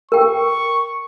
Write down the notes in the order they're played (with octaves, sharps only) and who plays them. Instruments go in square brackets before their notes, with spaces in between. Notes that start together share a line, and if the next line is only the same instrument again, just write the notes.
[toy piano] A#4 G5 [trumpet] C#6